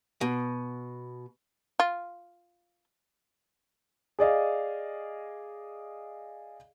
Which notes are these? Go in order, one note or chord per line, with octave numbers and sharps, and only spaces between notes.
B2
F4
G#4 D5 D#5 F5